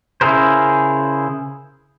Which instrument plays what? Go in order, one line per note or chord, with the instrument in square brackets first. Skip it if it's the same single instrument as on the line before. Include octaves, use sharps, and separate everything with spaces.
[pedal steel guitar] C#3 E4 G#4 A#4 C5